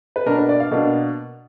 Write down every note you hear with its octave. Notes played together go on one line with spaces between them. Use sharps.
B4
B2 A#3 D4 A#4
B4
D5
F5
B2 A#3 D4